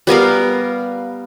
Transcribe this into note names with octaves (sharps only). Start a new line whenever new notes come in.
G3 B3 A#4 F5